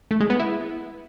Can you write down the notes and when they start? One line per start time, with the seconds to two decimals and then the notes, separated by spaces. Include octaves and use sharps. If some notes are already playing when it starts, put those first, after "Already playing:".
0.11 A3
0.20 G#3
0.30 B3
0.39 E4